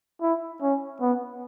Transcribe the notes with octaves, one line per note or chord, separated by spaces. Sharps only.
E4
C#4
B3